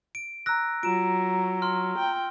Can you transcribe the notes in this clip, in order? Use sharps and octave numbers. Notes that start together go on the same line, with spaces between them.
D7
A#5 E6 F#6 A#6
F#3 F4 A#5 D7 E7
C6 F6
G5